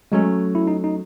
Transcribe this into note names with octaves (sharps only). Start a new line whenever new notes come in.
F#3 G#3 A3 C#4
E4
D#4
D#4